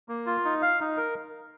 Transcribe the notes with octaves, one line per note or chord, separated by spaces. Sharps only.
A#3
F4
D#4
F5
D#4
A#4